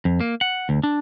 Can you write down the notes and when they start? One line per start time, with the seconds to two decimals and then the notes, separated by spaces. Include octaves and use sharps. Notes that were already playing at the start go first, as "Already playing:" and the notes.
0.05 F2
0.20 A#3
0.41 F#5
0.69 D2
0.83 D4